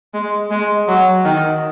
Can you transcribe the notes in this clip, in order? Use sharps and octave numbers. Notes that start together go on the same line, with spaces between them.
G#3
G#3
F#3
D#3